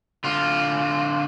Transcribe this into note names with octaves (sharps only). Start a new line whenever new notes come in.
D3 F4